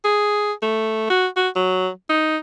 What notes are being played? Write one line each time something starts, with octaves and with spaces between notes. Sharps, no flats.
G#4
A3
F#4
F#4
F#3
D#4